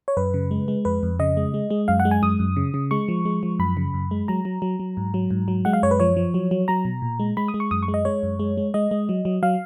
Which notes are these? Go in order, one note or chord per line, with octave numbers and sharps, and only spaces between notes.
C#5
F#2 B4
C#3
G#3
G#3
F2 B4
F2
C#3 D#5
G#3
G#3
G#3
F#2 F5
F#5
G#3
G#5
F#2 D#6
F#2
C#3
C#3
G#3 C#6
F3
G#3
F3
F#2 B5
C#3
F#2
G#3
F#3 A#5
F#3
F#3
F#3
G#2
F#3
G#2
F#3
G#3 F#5
F5
F#2 C#5
B4
F3 C#5
F3
F#3
F#3
F#3 A#5
B2
A#2
G#3
G#3 B5
D#6
G#3
C#6
F#2 D#6
C#6
G#3
D#5
G#3 C#5
F#2
G#3
G#3
G#3 D#5
G#3
F#3
F#3
F#3 F5